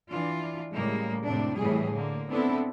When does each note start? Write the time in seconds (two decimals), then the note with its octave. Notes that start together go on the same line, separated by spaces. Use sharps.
0.11 E3 D4 F4
0.72 A2 C#3 G3 G#3 A#3
1.26 F2 A2 C3 C4 D4
1.56 A2 E3 G3 G#4
1.92 D3 A#3
2.29 B3 C4 D4 E4 A4 B4